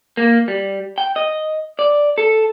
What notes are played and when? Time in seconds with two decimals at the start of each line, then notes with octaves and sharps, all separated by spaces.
0.17 A#3
0.48 G3
0.98 G5
1.16 D#5
1.79 D5
2.18 A4